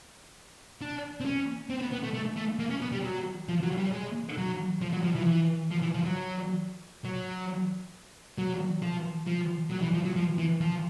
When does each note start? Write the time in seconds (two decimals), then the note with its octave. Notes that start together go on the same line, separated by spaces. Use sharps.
0.81 D4
1.21 C4
1.25 C#4
1.70 C4
1.82 B3
1.93 B3
2.04 A3
2.14 A3
2.37 A3
2.59 A#3
2.70 C#4
2.82 B3
2.92 G3
3.04 F#3
3.49 F3
3.63 F#3
3.78 G3
3.93 G#3
4.38 F#3
4.82 F3
4.93 F#3
5.04 F3
5.15 E3
5.22 F3
5.27 E3
5.71 F3
5.82 E3
5.93 F3
6.05 F#3
7.05 F#3
8.38 F#3
8.83 F3
9.27 F3
9.72 F#3
9.83 E3
9.94 F3
10.05 F#3
10.16 F3
10.38 E3
10.61 F3